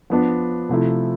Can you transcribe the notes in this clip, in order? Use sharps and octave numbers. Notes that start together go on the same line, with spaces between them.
F3 B3 D4
C3 F3 A3 E4